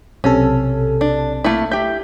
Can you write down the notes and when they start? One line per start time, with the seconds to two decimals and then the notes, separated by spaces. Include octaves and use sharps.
0.24 B1 C3 C#4 A4
1.01 D4
1.44 A3 A#3 E4
1.71 G4 E5 G6